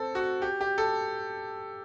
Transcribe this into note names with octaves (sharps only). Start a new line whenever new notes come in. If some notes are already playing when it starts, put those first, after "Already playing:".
Already playing: C4 A4
F#4
G4
G4
A4